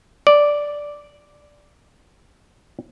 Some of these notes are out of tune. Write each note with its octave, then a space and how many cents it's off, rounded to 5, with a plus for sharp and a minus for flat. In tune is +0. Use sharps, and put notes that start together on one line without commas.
D5 -5